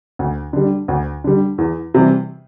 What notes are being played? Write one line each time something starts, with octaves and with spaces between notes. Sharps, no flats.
D2
D3 G3
D2
D3 G3
E2
C3 E3 G3